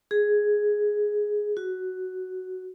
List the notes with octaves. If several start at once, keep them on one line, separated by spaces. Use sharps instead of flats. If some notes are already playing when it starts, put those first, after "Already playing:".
G#4
F#4